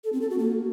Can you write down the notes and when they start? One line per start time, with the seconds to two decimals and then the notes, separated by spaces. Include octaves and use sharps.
0.04 A4
0.13 C4
0.21 A4
0.30 F#4
0.39 A#3